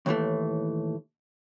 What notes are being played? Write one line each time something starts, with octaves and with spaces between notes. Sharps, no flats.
D#2 A2 E3 A3